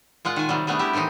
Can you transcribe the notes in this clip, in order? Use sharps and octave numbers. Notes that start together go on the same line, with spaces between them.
A#2 G#3 F4 F#5
D#3 G#5
C3 D#3 F#3 G3
G3 A3 B3 D4 G#4
E4 G4 E5
A2 D#3 E3 C4 D#4